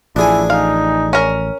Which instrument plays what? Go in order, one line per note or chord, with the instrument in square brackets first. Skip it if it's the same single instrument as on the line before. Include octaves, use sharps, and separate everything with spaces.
[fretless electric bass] A1 F3 [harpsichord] D4 G#4 G#5 [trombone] E4
[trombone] D#4 [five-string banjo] F5
[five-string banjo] C#4 A#4